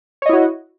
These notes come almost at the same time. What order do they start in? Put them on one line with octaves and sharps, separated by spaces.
C#5 D#5 E4 F#4